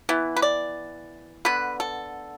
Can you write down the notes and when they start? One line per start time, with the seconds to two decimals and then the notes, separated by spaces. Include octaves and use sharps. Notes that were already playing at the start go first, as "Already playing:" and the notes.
0.09 E3 B3 E4
0.36 B4
0.42 D5
1.45 D3 B3 B4
1.80 A4